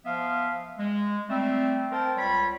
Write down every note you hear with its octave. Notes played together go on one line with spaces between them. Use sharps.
F3 B3 E5 F5
G#3
G3 A3 C4
C4 A#4 C5 G5 A5
C#2 G3 C#5 B5